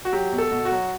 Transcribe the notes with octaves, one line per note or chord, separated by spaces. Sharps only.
F#4
F#3 G4
B2
A4
B2
F#4
F#3